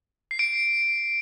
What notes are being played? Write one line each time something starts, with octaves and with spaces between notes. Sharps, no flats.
C7
D7